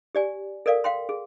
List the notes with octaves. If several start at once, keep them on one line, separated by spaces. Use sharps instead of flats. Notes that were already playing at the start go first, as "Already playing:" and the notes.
G4 D5 G#5
A4 A#4 D5 F5
F5 G5 C6
G#4